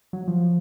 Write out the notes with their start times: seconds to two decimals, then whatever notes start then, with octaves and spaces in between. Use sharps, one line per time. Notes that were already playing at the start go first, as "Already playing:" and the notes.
0.13 F#3
0.28 F3